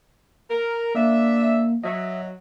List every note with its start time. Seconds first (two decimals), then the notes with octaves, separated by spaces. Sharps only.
0.50 A#4
0.95 A#3 D4 E5
1.84 F#3 D#5 E5